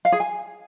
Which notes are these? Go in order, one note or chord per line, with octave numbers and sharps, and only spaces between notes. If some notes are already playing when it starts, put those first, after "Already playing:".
F5
G#4
G#5